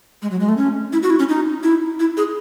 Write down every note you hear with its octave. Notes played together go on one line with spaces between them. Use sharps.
G#3
F#3
G#3
A3
C#4
E4
F#4
E4
C#4
D#4
E4
E4
G#4